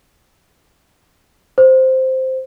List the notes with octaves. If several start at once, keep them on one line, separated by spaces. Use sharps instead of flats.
C5